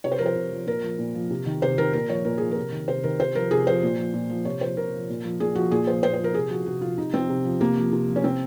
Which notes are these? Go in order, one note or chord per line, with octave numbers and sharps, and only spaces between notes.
C3 C#5
C5
F3 A#4
C5
C3
F3
A#2 A#4
F3
A#2
F3
C3
D#3
C3 C5
D#3 A#4
A#2 A#4
F3 C#5
A#2 A#4
F3 G#4
C3 A#4
D#3
C3 C5
D#3 A#4
C3 C5
F3 A#4
C3 G#4
F3 C5
A#2
F3
A#2
F3
C3 C#5
F3 C5
C3 A#4
F3
A#2
F3
A#2 G#4
F3 F#4
A#2 G#4
F3 C5
A#2 C5
C5
F3 A#4
C3 G#4
F3 F#4
C3 F#4
F3 F4
C3 D#4
F3 C4
C3
F3
C3 A#3
F3
C3
F3
C#4
C3 C4